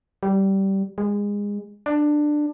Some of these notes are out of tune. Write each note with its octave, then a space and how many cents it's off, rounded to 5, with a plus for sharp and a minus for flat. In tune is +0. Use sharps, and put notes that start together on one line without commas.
G3 -15
G#3 -25
D4 +15